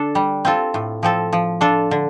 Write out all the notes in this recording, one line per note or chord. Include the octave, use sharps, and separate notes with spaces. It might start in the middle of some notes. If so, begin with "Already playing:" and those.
Already playing: D3 D4 A4
G3
C4 F4 A4
A2
F3 C4 A4
F3
D4 F4 A4
D3